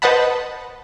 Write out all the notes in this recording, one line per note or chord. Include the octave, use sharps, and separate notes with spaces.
B4 C5 D#5 F#5 A5 B5